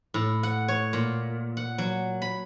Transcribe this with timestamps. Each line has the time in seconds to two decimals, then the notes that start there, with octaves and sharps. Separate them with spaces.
0.14 A2
0.43 F#5
0.68 C#5
0.93 A#2
1.57 F#5
1.78 F#3
2.22 B5